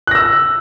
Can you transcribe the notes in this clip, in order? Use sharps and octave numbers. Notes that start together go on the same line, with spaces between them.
E6 F#6 A#6